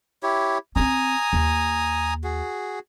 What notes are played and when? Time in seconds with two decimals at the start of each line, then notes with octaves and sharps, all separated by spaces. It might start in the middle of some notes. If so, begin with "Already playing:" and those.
0.23 E4 G4 C#5
0.76 C4 C#4 G#5 A#5 D#6
1.33 D#2
2.24 F#4 G#4